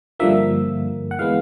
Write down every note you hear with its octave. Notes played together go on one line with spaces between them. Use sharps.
G2 D3 F3 A#3 E5
F#5
E3 G#3 B3 F5